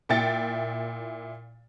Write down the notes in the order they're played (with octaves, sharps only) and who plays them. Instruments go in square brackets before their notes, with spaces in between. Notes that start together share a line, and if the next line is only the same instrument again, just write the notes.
[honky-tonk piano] A#2 E4 G5 A6 C#7